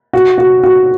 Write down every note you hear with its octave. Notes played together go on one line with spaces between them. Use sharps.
F#4
F#4
F#4